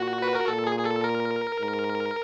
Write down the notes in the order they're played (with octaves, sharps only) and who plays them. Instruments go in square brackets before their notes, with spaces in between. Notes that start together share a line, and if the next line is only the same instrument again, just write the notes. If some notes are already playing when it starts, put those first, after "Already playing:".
Already playing: [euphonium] A#2 [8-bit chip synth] F#4
[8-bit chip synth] B4
A#4
[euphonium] A#2 [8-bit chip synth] A4
[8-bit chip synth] G#4
G#4
A4
A#4
[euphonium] G#2